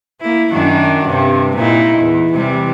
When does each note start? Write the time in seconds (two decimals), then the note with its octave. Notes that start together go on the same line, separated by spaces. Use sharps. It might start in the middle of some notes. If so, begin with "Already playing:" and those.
0.21 A#3 E4
0.52 F#2 D#3 D4
1.05 G2 C3
1.56 A#2 D#4 E4
1.98 E2
2.34 C3 E3 G3